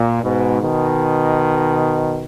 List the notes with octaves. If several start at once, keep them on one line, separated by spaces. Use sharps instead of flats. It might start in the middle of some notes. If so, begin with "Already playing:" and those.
Already playing: A#2
G#2 B2
B2 D#3